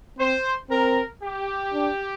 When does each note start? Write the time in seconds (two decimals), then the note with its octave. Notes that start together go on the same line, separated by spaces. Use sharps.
0.18 C4 C5
0.70 C4 A#4
1.22 G4
1.73 D4